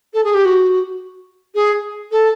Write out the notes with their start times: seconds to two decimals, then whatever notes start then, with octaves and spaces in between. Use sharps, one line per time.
0.13 A4
0.24 G#4
0.34 G4
0.45 F#4
1.54 G#4
2.11 A4